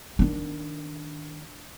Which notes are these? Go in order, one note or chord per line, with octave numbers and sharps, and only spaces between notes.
D#3 D4